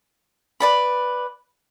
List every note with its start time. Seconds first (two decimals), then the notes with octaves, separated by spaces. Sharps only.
0.60 B4 D5 B5